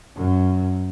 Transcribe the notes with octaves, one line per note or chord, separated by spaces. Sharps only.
F#2